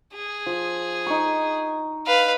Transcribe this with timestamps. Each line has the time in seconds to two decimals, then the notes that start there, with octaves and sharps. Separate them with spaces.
0.15 G#4
0.46 F3
1.07 D#4 C#6
2.07 B4 F5